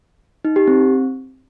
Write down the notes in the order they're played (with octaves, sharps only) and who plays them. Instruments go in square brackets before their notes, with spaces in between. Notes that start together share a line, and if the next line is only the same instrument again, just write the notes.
[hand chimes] D#4
G4
C4